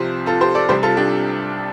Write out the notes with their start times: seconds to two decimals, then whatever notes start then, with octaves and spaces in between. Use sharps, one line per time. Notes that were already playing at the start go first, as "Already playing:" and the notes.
Already playing: C2 C3 F3 G4 C5
0.26 F4 A4
0.41 G4 C5
0.55 A4 D5
0.68 C2 C3 G3 G4 C5
0.83 F4 A4
0.97 D4 G4